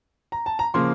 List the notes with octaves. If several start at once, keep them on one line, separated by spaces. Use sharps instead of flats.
A#5
A5
A#5
C#3 F3 A#3 C6